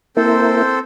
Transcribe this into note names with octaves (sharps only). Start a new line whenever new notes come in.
A#3 C4 E4 A4 A#4 C5